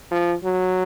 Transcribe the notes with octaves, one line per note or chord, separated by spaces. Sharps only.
F3
F#3